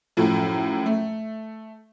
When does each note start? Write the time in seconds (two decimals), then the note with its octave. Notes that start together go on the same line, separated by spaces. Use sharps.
0.17 F#2 A2 F3
0.86 A3